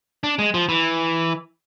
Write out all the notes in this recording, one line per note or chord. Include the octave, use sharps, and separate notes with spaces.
D4
G#3
F3
E3